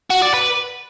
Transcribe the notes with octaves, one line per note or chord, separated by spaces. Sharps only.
F#4
D5
B4